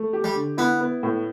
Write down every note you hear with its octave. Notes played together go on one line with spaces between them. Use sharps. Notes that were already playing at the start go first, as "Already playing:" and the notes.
Already playing: A3
G4
G3
D3
B3 E4
B3
A2